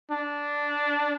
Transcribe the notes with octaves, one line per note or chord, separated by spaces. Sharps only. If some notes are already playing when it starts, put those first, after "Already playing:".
D4